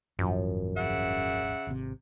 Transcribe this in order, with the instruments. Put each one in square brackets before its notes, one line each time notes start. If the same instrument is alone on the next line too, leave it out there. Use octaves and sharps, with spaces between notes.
[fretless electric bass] D#1 G#1 F3 [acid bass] F#2
[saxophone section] C#3 E5 F#5
[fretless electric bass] G#1 C3